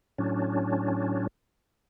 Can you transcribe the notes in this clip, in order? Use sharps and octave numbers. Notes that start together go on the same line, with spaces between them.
A2 F#3 C#4 D4